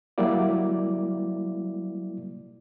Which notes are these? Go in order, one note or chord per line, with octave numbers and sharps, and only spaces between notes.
F#3 G3 A#3 E4 D5